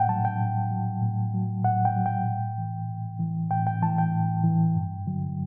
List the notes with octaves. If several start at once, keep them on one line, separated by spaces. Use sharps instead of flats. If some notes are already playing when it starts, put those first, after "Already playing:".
Already playing: A2 F#5 G5
F#3 A5
G5
A2
F#3
A2
F#3
A2 F#5
G5
F#3
G5
A2
E3
A2
E3
A2 G5
G5
E3 A5
G5
A2
E3
G2
D3 F#3